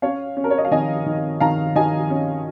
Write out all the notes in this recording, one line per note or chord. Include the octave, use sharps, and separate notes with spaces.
C#4 C#5 F5
C#4
A#4
C#5
D#5
F5
D#3 D#5 G#5
D#3
D#3 F5 A#5
D#3 D#5 G#5
C#4